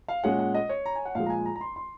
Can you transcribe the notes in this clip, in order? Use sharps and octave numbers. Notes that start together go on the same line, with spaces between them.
F5
A#2 G#3 C#4 F#5
F#5
D#5
C#5
A#5
G#5
F#5
A#2 F3 G#3 F5
A#5
G#5
A#5
A#5
C6
C6